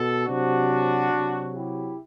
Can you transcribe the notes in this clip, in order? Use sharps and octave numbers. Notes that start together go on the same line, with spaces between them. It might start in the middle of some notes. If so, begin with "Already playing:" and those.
Already playing: B2 A4
C3 F#3 D4 F#4
C3 F#3
E4 G4